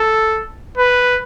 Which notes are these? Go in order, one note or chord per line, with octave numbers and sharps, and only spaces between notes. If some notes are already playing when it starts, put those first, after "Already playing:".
Already playing: A4
B4